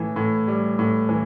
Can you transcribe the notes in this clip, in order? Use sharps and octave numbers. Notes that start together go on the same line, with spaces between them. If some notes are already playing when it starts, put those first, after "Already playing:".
Already playing: A2 E3
A2
G3
A2
E3